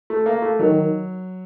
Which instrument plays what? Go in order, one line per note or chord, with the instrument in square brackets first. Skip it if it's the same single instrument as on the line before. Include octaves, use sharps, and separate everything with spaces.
[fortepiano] A3
A#3
A3
[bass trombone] D#3 [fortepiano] F#3